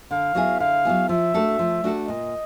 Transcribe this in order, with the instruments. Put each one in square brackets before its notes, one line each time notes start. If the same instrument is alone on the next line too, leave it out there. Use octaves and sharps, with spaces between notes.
[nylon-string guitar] D3 [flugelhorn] F5
[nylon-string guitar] F#3 B3 E4 G#4
[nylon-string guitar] D3 [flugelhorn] F5
[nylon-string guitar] F#3 B3 E4 G#4
[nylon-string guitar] F3 [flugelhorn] E5
[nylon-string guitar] A3 D4 F#4 A4
F3
A3 D4 F#4 A4
[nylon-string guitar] A#2 [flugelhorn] D#5